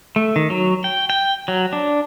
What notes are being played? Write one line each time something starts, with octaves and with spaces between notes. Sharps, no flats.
A3
D#3
F#3
G5
G5
F#3
D4